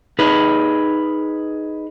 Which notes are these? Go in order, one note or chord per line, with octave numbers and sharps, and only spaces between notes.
D#4 G#4 B4